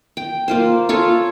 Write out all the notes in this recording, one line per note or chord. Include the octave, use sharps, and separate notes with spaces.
G5
A#3 F4 C5
F4 A4 C#5